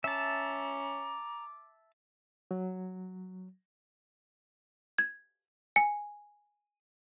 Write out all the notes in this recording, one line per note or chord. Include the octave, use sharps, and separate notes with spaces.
C#4 E5 A5 A#5 D6
F#3
G#6
G#5